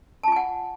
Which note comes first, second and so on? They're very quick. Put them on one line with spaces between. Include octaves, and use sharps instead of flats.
A5 F4 G#5 F#5